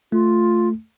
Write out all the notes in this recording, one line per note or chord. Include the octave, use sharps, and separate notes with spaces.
A3 F4